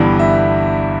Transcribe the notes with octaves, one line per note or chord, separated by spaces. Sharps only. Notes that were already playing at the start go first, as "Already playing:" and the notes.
Already playing: G1 G2 E3 B3
E5